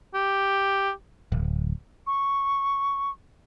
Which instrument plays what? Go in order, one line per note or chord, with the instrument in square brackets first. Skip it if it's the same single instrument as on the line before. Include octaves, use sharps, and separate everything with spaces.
[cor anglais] G4
[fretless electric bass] D1
[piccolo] C#6